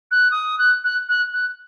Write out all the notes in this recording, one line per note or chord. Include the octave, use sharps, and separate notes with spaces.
F#6
D#6
F#6
F#6
F#6
F#6